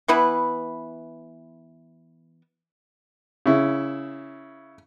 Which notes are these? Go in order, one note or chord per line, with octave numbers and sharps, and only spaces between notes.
E3 B3 E4 B4
C#3 E4